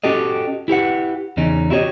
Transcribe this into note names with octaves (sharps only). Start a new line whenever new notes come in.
C#4 F#4 G4 A4 D#5
E4 G4 B4 F#5
E2 C#3 C#4 D#4
E4 F#4 G4 A#4 C#5 D#5